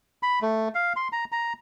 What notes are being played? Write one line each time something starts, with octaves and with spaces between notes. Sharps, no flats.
B5
A3
F5
C6
A#5
A#5